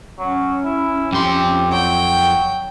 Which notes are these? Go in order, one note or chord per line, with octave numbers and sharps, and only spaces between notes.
F#3 C#4
E4
F2 G4 C6
F#3 G5